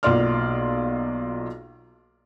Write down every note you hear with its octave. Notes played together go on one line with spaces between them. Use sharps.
B1 A#3 F4 D5 C6 F6